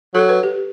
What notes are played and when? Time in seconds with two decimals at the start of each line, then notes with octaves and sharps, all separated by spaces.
0.14 F#3 A4
0.29 B4
0.43 G4